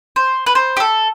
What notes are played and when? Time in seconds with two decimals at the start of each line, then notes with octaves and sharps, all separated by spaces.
0.16 C5
0.46 B4
0.55 C5
0.77 G4
0.80 A4